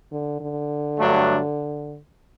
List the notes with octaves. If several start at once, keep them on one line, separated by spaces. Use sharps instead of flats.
D3
D3
G2 F#3 A3 D4